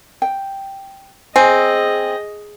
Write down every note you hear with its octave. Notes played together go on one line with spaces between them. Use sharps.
G5
C4 G#4 D#5 G#5